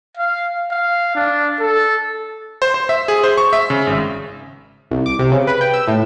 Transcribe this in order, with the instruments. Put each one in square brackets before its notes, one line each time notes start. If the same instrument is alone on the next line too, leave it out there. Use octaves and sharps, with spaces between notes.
[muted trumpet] F5
F5
D4
A4
[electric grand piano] C5
C5
E5
G#4
C5
C#6
E5
C#3
G#1
[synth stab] C2
D6
C3
C#3
B4
G5
E6
A2